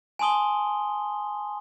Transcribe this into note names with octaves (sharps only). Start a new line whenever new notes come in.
G#5 A5 C6 D#6 G7